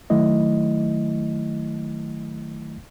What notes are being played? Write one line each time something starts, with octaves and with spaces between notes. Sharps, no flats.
D#3 F#3 A3 E4 D#5